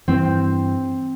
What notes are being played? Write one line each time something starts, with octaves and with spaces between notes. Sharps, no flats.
G2 E3 C4